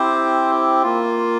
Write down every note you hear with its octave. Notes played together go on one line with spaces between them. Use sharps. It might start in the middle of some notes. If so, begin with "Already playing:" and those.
Already playing: C4 E4 G4 C5
A#3 F4